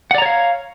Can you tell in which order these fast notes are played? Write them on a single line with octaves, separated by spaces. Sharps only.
F#5 D5 A#5 C#5 F5